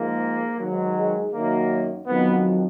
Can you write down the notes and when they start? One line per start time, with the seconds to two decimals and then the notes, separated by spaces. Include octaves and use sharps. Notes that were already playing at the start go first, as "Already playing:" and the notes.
Already playing: G#2 F3 A#3
0.59 G#2 D#3 F#3
0.97 G#3
1.33 F#2 D#3 F#3 A#3
2.07 F2 D#3 F#3 B3